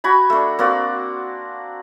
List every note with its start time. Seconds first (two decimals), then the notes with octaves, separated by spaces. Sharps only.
0.04 F#4 G#5 B5
0.30 A3 D4
0.59 A#3 C4 F#4 D5